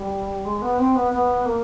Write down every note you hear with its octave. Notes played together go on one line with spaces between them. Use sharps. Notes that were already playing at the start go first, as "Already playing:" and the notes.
Already playing: G3
G#3
B3
C4
B3
B3
A#3